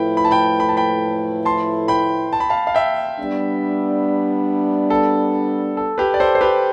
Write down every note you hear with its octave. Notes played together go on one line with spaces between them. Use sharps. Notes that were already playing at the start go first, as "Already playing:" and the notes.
Already playing: A2 F3 A3 E4 B4 G5 B5
B5
A5
G5 B5
B5
A5
G5 B5
A5 C6
G5 B5
A5
B5
F5 A5
F5
E5 G5
G3 B3 D4
A4
A4
G4 B4
D5
A4 C5
C5
G4 B4